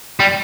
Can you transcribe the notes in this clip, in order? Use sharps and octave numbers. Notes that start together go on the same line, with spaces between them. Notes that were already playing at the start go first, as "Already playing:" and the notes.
G3